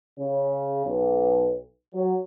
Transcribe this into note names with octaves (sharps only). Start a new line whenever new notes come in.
C#3
B1
F#3